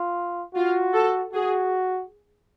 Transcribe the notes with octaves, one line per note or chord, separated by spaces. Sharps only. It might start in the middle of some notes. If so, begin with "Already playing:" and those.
Already playing: F4
F4 F#4
A4
F#4 G#4